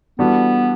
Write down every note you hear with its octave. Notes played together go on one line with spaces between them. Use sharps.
E3 G3 B3 D4 F#4 A4